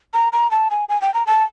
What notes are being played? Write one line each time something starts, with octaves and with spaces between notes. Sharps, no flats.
A#5
A#5
A5
G#5
G#5
G5
A#5
A5